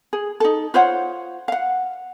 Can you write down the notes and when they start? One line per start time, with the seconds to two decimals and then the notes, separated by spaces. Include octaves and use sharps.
0.13 G#4
0.40 D#4 A4
0.74 F4 C5 C#5 F#5
1.48 F5 F#5